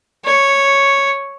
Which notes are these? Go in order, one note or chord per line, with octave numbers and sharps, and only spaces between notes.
C#5